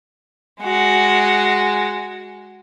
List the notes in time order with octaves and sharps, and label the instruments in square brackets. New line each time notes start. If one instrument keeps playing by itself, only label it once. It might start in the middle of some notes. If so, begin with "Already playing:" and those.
[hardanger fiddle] G#3 F#4